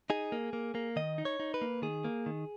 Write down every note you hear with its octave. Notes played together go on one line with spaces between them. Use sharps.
D#4 G#4
A#3
A#3
A#3
D#3 D#5
D#4
C#5
D#4
B4
A#3
D#3 G#4
A#3
D#3